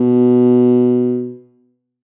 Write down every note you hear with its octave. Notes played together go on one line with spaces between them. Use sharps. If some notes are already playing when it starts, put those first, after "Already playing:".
Already playing: B2